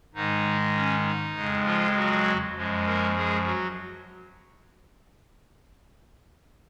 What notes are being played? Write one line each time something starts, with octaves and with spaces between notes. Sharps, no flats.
G#2 D#3 G#3 D#4
C#4
D#4
F2 C#3 G#3
F3 F4
F#3 F#4
F#2 F3 G#3
A#3 A#4
G#3 G#4
F#3 F#4